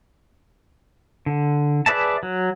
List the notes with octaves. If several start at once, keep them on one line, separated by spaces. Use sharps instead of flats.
D3
G#4 B4 D5 E5 A5
F#3